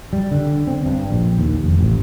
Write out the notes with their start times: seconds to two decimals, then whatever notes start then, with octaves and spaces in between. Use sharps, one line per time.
0.13 G3
0.31 D3
0.67 C4
0.86 G2
1.11 A#1
1.38 D#2
1.64 F1
1.79 A1